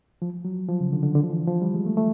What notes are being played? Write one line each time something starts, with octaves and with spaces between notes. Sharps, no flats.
F3
F#3
F3
C#3
D3
D3
D3
F3
E3
F3
G3
G#3
A3
A3